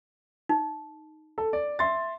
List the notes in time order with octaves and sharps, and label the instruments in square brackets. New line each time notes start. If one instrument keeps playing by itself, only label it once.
[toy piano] D#4
[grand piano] A4
D5
E5 C6 A6